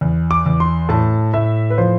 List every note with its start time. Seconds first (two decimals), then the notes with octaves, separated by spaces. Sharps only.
0.01 E2
0.31 D6
0.46 E2
0.60 C6
0.89 A2 A5
1.34 A2 E5
1.70 B4
1.78 F3 C5